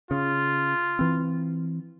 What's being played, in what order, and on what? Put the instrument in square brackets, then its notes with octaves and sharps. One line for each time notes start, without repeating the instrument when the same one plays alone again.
[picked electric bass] C#3 [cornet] F4
[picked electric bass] E3 C4